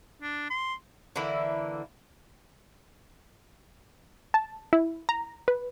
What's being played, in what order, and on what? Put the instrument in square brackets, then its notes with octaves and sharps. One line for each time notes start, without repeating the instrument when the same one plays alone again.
[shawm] D4
C6
[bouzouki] D3 E3 A#3 E4
[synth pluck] A5
E4
A#5
B4